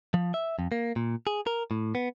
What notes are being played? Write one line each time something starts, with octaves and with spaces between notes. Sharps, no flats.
F3
E5
F2
A#3
A#2
G#4
A#4
A2
B3